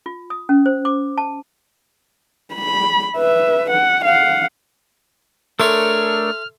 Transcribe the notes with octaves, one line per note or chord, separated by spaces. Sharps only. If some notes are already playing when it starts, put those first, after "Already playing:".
F4
D#6
C#4
C5
D6
A5
B5
B4 E5
F#5
F5 F#5
A3 D4 A4 A#4 C#5 E5 C6 F6